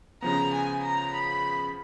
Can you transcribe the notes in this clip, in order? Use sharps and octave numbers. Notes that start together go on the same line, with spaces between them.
C#3 F3 B3 A#5
G#5
A#5
B5